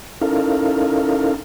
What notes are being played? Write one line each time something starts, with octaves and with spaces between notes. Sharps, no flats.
C#4 D#4 E4 A4 A#4 F5